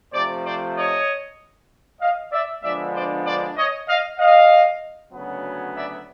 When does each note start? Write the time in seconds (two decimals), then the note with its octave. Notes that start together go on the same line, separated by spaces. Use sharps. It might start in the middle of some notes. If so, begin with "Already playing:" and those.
0.13 C3 F3 A3 C5 D5
0.44 C5 D5
0.76 C#5 D#5
2.00 D#5 F5
2.31 D5 E5
2.62 D3 F3 G#3 B3 D4 D5 E5
2.94 C5 D5
3.25 C5 D5
3.56 C#5 D#5
3.88 D#5 F5
4.19 D#5 F5
5.13 D2 C#3 F#3 B3
5.76 D5 E5